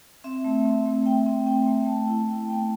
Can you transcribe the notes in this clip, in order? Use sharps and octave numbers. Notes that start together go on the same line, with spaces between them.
C4 E5
A3
C4
A3
C4 G5
C4
C4 G5
A3
B3 A5
E4
E4 G5
B3 G5